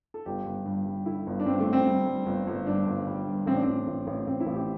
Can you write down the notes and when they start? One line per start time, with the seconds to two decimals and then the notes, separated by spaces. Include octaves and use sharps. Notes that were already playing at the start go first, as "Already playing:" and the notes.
0.14 A4
0.26 G1 G4
0.46 G1
0.66 G2
0.86 G3
1.06 D3 E4
1.27 G1
1.40 D4
1.46 G2 C4
1.60 A3
1.66 D3
1.73 C4
1.87 G3
2.06 G3
2.26 G1
2.47 G1
2.67 G2 D4
2.87 G1
3.07 G3
3.26 G2
3.46 A1 C4
3.55 D4
3.63 A1 C4
3.87 A1
4.07 A1
4.27 A1 C4
4.40 E4
4.47 A1
4.54 G4